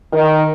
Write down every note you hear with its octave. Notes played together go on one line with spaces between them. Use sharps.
D#3